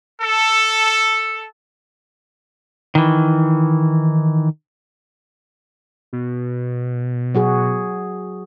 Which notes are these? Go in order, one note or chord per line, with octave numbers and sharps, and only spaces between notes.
A4
D#3 E3
B2
F#3 F#4 G#4